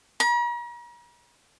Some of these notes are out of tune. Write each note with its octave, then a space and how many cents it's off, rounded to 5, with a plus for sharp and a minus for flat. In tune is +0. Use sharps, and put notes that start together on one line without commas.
A#5 +45